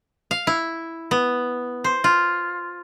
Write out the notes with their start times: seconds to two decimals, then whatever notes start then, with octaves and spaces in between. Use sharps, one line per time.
0.31 F5
0.47 E4
1.11 B3
1.84 C5
2.04 F4